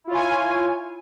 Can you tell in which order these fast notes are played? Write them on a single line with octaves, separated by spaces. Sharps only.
E4 F4 C#5 G#5